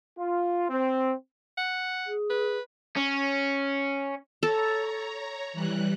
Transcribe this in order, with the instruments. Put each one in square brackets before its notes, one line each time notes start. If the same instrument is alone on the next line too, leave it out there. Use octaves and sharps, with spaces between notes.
[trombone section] F4
C4
[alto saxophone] F#5
[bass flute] G#4
[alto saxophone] B4
[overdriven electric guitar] C#4
[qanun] A4 [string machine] C#5 A#5
[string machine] E3 G3 F#6